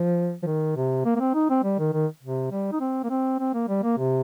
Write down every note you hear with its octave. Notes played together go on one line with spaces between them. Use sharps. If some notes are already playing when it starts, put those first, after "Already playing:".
Already playing: F3
F3
D#3
C3
A#3
A#3
C4
D#4
C4
G3
D#3
D#3
C3
G3
D#4
C4
A#3
C4
C4
A#3
G3
A#3
C3